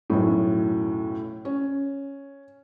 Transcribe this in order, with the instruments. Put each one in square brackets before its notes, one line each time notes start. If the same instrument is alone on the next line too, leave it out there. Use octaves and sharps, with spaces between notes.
[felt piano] B1 F#2 A2
C#4